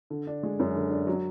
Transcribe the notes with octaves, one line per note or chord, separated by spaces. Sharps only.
D3
D4
G#3
F#2
D3
D4
F#3